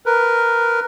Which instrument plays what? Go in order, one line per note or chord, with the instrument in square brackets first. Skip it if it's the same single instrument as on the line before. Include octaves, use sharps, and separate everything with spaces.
[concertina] A#4 B4